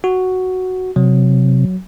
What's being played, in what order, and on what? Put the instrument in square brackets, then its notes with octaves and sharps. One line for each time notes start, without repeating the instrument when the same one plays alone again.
[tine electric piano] F#4
[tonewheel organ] C3 [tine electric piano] F#3